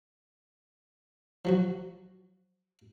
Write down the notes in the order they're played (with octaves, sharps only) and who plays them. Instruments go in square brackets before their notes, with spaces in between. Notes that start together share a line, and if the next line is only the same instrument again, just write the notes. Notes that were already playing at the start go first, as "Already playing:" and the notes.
[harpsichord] F3 F#3 F#4